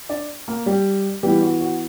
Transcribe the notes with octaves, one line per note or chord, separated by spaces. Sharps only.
D4 D5
A#3 A#4
G3 G4
E3 G3 B3 E4 G4
F#4
F#4